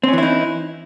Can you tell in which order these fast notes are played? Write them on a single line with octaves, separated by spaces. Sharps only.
C4 C#4 E3 E4 D#4